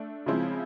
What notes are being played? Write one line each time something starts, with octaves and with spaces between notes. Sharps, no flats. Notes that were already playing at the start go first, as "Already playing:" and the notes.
Already playing: A3 D4
C#3 F3 G#3 C4 E4